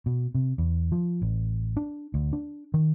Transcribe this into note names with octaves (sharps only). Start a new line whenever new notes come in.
B2
C3
E2
F3
A1
D4
D2
D4
D#3